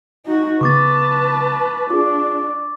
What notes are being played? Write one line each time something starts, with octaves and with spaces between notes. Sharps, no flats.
D#4 F#4
C#3 B3 B4 A5 C#6 D6 A6
D4 F4 G#4 D6